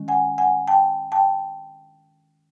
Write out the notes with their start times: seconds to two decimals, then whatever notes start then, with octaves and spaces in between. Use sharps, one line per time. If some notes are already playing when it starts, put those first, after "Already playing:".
Already playing: D#3 G#3 C#4
0.08 F#5 G#5
0.38 F#5 G#5
0.67 G5 A5
1.12 G5 A5